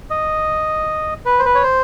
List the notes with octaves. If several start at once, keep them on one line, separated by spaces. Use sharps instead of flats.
D#5
B4
C5
B4
C#5
C5